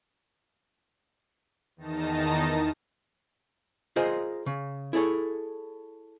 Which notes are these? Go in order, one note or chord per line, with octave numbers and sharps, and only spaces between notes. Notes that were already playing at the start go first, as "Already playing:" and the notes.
E2 D#3 D#4 A5 A#6
F4 G#4 A#4 C5 D#5
C#3
E4 G#4 A4 C#5